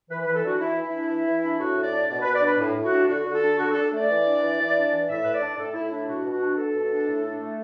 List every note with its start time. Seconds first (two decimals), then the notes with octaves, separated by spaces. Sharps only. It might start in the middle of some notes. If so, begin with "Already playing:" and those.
0.09 E3 B4
0.22 E3 B4
0.34 A4
0.43 D4 F#4
0.59 E3 E4
0.76 E3
0.84 E4
0.92 D4
1.09 E3
1.25 E3
1.42 D4
1.58 A2 F#4
1.76 A2
1.84 D5
1.92 D4
2.08 B2 D5
2.21 B2 B4
2.34 D5
2.42 D4 B4
2.59 A2
2.75 A2
2.83 F#4
2.91 D4
3.08 D3 F#4
3.25 D3
3.33 A4
3.41 D4
3.58 D3 F#4
3.71 D4 A4
3.92 A3 D5
4.08 E3
4.24 D4
4.41 E3
4.58 E3
4.74 D4
4.91 E3
5.08 A2 E5
5.24 A2 B4
5.33 D5
5.41 D4
5.58 A2 A4
5.74 A2 E4
5.90 D4 E4
6.08 B2 F#4
6.24 B2
6.32 F#4
6.41 D4
6.57 B2 A4
6.74 B2
6.91 D4
7.07 A2
7.24 D4
7.40 A3